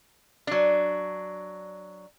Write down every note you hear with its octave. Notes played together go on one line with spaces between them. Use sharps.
F#3 D4